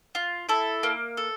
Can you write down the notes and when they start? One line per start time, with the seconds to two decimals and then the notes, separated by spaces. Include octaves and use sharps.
0.15 F4
0.49 E4 A4
0.83 A#3
1.17 A4